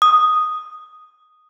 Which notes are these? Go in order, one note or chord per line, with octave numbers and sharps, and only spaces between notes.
D#6